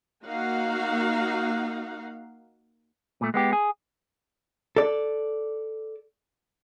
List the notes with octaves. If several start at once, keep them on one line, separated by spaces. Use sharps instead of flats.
A#3 D#4 F#4 F5 F#5
A#2 A3
G#3 B3 G4
G#4
A4 D5